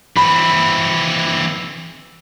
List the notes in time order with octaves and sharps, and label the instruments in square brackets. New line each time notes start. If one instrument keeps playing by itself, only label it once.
[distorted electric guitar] E3 C4 [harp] B5